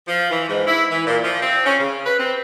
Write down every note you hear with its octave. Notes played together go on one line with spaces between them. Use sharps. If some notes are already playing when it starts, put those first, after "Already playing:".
F3
E3
G#2
E4
E3
A#2
F3
C4
C#4
C#3
B4
C4